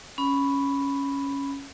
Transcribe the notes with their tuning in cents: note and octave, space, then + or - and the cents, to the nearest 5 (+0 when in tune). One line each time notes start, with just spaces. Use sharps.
C#4 +0 B5 +0